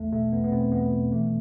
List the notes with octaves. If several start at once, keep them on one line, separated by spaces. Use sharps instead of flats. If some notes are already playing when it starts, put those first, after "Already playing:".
Already playing: A1 E2 A3
B2 A3
E2 B3
B3
B2 C4
E2 B3
B2
E3 A3